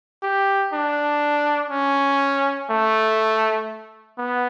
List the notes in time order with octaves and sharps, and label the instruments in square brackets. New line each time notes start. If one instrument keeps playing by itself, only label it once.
[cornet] G4
D4
C#4
A3
B3